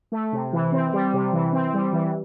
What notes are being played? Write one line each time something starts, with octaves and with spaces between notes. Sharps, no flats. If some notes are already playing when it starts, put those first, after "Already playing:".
A3
C3
E3
C4
G3
C3
E3
C4
G3
E3